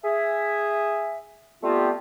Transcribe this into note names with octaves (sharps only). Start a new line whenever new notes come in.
G#4 E5
G3 A3 B3 C4 F4 G4